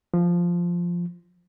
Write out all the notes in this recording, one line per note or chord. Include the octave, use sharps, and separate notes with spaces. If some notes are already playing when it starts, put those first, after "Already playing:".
F3